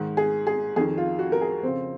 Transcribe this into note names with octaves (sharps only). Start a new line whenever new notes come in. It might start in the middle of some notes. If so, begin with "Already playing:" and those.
Already playing: G#2 D#3
G#4
G#4
F2 D#3 G#4
F4
F#4
A#4
G#4
F2 C#3 C4